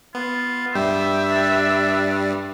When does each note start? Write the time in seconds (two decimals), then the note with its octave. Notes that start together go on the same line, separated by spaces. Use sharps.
0.15 B3 F4
0.75 G2 G3 E5 G5
1.30 D4